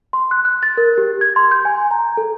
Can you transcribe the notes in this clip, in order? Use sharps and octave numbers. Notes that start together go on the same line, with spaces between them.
C6
F#6
F#6
A6
A#4
G4
G#6
C6
G6
G#5
A#5
A4